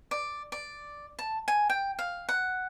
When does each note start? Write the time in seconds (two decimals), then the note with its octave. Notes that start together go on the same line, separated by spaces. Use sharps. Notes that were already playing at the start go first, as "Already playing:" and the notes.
0.11 D5
0.52 D5
1.19 A5
1.48 G#5
1.70 G5
1.99 F5
2.29 F#5